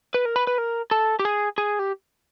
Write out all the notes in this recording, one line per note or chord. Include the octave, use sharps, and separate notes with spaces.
B4
A#4
B4
B4
A#4
A4
G4
G#4
G#4
G4